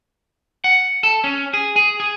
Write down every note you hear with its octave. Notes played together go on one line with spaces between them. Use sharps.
F#5
A4
C#4
G#4
G#4
G#4